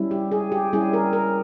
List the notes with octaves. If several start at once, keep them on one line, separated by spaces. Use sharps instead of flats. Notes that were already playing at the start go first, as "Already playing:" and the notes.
Already playing: G3 C#4 E4
G4
G#4
G4
G3 C#4 E4 G#4
A#4
A#4